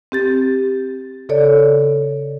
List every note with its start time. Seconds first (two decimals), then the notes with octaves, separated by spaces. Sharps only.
0.12 C4 G4 A6
1.29 C#3 A4 C#5 D5